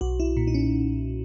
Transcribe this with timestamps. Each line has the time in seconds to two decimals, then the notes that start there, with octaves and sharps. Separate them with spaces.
0.01 B1 F#4
0.20 E4
0.37 A#2
0.47 D#4
0.54 C#4